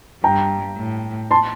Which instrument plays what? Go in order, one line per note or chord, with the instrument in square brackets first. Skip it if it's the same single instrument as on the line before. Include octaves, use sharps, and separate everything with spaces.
[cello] G2 [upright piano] G5 A#5
[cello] A2
[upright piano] A5 C6